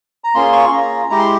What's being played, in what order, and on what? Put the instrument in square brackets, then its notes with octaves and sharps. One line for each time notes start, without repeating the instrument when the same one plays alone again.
[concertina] A#5
A#3 C#4 F4 G#4 C6
C#6
C6
A#3 C#4 F4 G#4 A#5
G#3 E4 G4 A#5
C6